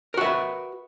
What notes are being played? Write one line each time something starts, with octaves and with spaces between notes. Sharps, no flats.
F#4 A#4 B4 E5